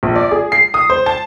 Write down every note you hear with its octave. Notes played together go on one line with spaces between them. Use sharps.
A#1
D5
G#4
C7
D#6
C5
A5